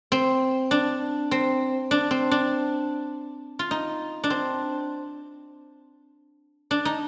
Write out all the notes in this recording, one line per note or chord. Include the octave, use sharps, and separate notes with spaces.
C4
D4
C4
D4
C4
D4
F4
D#4
D4
C4
D4
D#4